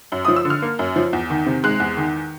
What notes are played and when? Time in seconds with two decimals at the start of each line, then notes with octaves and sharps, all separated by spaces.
0.12 F#2
0.25 F3 D#6
0.36 E6
0.45 D3
0.50 F6
0.62 A#3
0.79 F#2
0.96 F3
1.13 E2
1.30 D#3
1.46 C3
1.64 G#3 F#6
1.80 E2
1.97 D#3